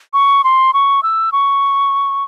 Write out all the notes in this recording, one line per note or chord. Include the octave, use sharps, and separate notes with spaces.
C#6
C6
C#6
E6
C#6